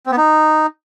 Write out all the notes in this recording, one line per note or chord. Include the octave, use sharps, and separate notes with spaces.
C4
B3
D#4